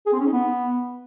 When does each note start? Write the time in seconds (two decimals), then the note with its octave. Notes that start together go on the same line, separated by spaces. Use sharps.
0.06 G#4
0.13 C4
0.19 C#4
0.26 D#4
0.33 B3